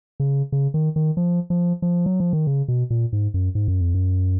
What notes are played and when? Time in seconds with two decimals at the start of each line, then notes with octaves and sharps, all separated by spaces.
0.20 C#3
0.52 C#3
0.74 D#3
0.96 D#3
1.17 F3
1.50 F3
1.82 F3
2.06 F#3
2.20 F3
2.33 D#3
2.47 C#3
2.68 B2
2.90 A#2
3.13 G#2
3.34 F#2
3.55 G#2
3.68 F#2
3.81 F2
3.95 F#2